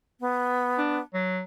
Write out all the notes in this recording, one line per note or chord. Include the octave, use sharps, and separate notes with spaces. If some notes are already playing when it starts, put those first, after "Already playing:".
B3
D4
F#3